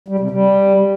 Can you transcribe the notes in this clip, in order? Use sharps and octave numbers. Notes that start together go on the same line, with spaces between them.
G3
C3
G3